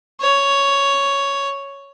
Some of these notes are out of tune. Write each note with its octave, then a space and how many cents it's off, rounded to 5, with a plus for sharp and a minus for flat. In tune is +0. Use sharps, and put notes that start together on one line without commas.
C#5 +5